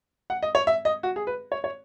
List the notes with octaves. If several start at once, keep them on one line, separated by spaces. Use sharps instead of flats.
F#5
D#5
C#5
E5
D#5
F#4
G#4
B4
C#5
C#5